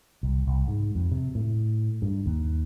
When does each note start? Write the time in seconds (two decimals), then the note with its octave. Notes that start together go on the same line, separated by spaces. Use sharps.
0.23 C2
0.47 C2
0.68 G#2
0.95 F2
1.12 C3
1.35 A2
2.02 G2
2.26 D#2